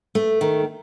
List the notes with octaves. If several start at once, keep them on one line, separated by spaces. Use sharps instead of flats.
A3
D#3